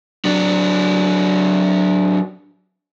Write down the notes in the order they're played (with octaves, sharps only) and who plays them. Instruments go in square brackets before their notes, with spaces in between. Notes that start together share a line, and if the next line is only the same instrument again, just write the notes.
[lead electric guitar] F#3 D4